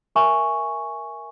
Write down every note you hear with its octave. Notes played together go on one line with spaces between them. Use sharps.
A#4 E5 G#5 C#6